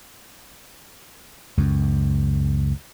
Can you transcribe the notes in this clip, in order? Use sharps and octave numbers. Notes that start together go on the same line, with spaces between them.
C#2 F#2